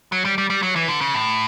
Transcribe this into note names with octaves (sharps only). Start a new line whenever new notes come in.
F#3
G3
G3
G3
F#3
E3
D3
C#3
A2